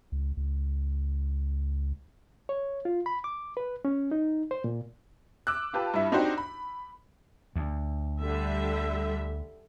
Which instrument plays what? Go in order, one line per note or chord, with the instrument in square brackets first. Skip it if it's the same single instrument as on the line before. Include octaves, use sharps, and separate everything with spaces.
[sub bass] C#2
C#2
[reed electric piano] C#5
F4
B5
D6
B4
C#4
D#4
C5
A#2
[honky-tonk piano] D6 E6 F#6
F4 G4 B4 A5
G2 E4 E5
C4 D4 D#4 F#4 G4 C5
B5
[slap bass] D2
[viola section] D3 G3 E5